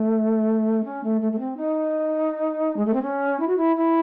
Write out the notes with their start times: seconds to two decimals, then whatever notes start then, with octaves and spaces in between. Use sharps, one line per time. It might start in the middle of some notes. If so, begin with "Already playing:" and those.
Already playing: A3
0.84 C#4
1.03 A3
1.21 A3
1.32 A3
1.39 C4
1.57 D#4
2.76 G#3
2.85 A3
2.93 C4
3.02 C#4
3.39 E4
3.47 F#4
3.57 E4
3.76 E4